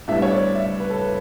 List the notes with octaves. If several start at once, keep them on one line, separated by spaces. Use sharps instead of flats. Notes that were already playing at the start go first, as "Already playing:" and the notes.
A2 G3 B3 D4 E5
C#5
D5
E5
B4
A4
B4